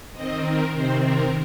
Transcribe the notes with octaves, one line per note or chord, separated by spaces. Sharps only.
D#3 C4 D#5
A#4
C3 D#3 C4 C5
A#4